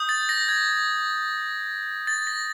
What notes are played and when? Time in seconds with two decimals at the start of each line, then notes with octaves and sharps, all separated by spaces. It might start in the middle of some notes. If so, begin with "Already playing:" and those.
Already playing: D#6 G6
0.09 A6
0.29 A#6
0.49 G#6
2.07 A6
2.27 A#6